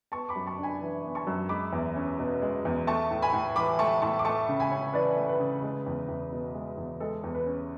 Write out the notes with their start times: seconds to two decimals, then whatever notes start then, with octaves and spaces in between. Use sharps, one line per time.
0.12 B3 A5 C#6
0.29 B5 D6
0.36 F#2
0.46 A5 C#6
0.58 D4
0.63 G#5 B5
0.81 E3
1.04 B3
1.15 A5 C#6
1.27 F#2
1.49 G#3 B5 D6
1.72 E2
1.96 C#4
2.19 B2
2.42 G#3
2.65 E2
2.87 A3 A5 C#6
3.11 A2
3.22 G#5 B5
3.33 A2
3.56 E3 B5 D6
3.79 A3 A5 C#6
4.02 A2 A5 C#6
4.19 D6
4.25 A3 A5 C#6
4.49 C#3
4.60 G#5 B5
4.71 C#4
4.94 E3 B4 D5
5.17 A3
5.29 B4
5.40 C#3
5.62 G#3
5.86 E2
6.08 E2
6.32 B2
6.55 G#3
6.77 E2
7.00 G#3 A4
7.24 E2
7.35 B4
7.46 C#4